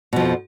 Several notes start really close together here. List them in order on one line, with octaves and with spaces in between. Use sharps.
B2 F3 F2